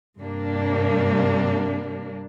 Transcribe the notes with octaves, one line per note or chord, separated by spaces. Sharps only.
G2 C3 G3 A#3 D4